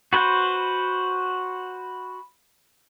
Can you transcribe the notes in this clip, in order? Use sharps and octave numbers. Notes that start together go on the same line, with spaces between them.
F#4 B4 C5